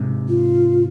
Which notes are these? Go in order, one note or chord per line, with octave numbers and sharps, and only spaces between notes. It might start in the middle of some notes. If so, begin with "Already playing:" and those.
Already playing: G#2 C3
F4